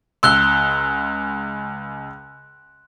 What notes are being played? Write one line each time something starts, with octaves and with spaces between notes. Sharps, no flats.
C#2 C6 E6 F#6 G7